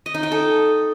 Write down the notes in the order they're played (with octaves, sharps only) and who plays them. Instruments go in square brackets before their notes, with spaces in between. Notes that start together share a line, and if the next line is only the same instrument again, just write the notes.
[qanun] D#5
D#4
G5
A4